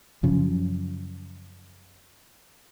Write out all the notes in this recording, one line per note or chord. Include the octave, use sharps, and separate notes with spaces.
F#2 C#3 F3